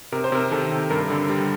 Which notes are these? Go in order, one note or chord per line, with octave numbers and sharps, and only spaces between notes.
C3 A#4
C5
C3 A#4
D#3 A4
C3
G2 A#4
D3
G3